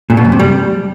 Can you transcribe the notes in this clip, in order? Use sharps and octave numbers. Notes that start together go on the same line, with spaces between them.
A#2
B2
F#2
C3
G3